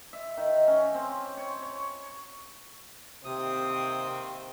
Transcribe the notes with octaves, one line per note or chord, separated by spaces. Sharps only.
E5
D#3
C#4
C4
C#5
C#5
C3 D#3 A#3 C4 D#6